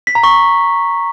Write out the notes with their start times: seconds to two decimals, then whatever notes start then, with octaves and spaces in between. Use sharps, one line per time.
0.07 B6
0.15 A#5
0.24 C#6